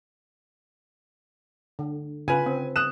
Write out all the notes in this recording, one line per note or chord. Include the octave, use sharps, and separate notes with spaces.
D3
C#3 F4 B4 G#5
C4
D#6 F#6 E7